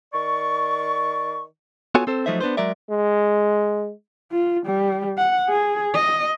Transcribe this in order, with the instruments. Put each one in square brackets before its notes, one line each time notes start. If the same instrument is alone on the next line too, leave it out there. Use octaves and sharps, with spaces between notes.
[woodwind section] D#3 D5 C#6
[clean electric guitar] B3 F4 F#4 A4 C#5 G#5
C4 A4 C5
F3 F#3 A3 D#4 C5 E5
B3 D4 B4 C5
F#3 G#3 A#4 D5 E5
[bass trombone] G#3
[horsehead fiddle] F4
G3
F#5
G#4
D#5